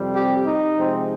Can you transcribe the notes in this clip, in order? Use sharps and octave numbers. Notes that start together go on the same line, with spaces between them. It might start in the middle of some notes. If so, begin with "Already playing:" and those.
Already playing: F2 C3 G3 C4
G4
D#4
C3 F3 G#3 C4